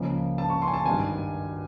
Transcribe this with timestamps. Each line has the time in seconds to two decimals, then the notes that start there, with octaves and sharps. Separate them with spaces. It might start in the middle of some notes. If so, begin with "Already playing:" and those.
Already playing: C#2 C#3 F3 A#3
0.38 A5
0.50 C#6
0.62 C6
0.68 G#5
0.74 A5
0.86 G#1 G2 D#3 G#5